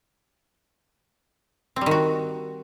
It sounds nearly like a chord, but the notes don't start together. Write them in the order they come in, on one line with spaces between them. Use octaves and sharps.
C4 G3 D#3 F#4